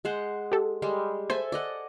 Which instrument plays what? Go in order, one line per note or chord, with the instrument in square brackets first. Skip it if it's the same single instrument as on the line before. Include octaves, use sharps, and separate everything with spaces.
[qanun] G#3 C5 F#5
[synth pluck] G4 A4
[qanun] G3 G#3
[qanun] A4 E5 G#5 [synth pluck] C5
[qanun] D5 D#5 F#5